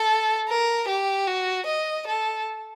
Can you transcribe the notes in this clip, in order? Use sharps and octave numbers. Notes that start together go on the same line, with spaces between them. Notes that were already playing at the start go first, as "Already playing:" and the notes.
Already playing: A4
A#4
G4
F#4
D#5
A4